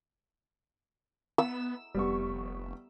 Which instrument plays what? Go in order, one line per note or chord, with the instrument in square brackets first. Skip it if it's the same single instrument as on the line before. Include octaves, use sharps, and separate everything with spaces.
[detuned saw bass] B3 [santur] E6
[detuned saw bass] F1 [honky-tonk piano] G3 B3 C#6